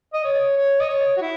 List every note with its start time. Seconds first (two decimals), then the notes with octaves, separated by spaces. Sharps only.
0.14 D#5
0.24 C#5
0.57 C#5
0.80 D#5
0.89 C#5
1.17 F#4
1.21 E4